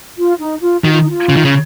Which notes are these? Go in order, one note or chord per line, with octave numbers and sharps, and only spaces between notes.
F4
D#4
F4
D#3 F#4
F4
D#4
F4
C#3
D#3
C#3